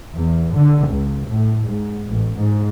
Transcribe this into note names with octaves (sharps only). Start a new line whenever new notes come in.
E2
D3
C#2
A2
G#2
A1
G#2